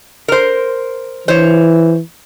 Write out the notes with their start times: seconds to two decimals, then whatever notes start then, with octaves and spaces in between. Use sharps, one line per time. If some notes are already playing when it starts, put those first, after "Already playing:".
0.28 A#4 C5
1.28 E3 C5 C#5